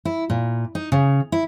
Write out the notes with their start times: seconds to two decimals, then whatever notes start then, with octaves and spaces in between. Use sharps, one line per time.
0.05 E4
0.30 A#2
0.75 D#4
0.92 C#3
1.32 E4